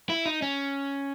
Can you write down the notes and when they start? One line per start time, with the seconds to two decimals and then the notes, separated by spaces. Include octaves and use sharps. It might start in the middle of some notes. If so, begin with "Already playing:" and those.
0.10 E4
0.26 D#4
0.42 C#4